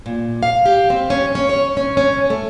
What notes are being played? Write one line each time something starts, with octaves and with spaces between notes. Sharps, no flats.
A#2
F5
G4
C4
C#4
C#4
C#5
C#4
C#4
A3